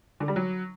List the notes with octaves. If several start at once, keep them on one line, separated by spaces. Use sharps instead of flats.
D3
G3
F#3